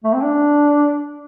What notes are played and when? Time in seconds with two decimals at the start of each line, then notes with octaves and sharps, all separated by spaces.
0.04 A3
0.13 C4
0.23 D4